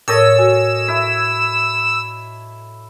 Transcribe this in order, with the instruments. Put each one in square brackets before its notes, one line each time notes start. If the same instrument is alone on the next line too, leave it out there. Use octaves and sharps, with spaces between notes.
[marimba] A2 A#4 D#6 [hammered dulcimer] A4 C#5 D#5 [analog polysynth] E6
[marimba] F#4 G#5
[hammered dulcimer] E4